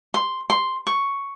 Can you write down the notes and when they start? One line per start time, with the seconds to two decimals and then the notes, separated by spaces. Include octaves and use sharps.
0.14 C6
0.50 C6
0.87 C#6